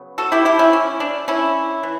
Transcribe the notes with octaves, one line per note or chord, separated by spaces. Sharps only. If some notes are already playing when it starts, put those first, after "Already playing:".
Already playing: C#3 F#3 B3
F#4 A4
E4 G4
E4 G4
C#4 E4
C#4
D4
C#4 E4
E3